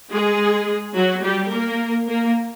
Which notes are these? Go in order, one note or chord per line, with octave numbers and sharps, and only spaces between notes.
G#3 G#4
F#3 F#4
G3 G4
A#3 A#4
A#3 A#4